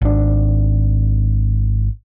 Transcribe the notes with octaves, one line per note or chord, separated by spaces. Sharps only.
G#1 D4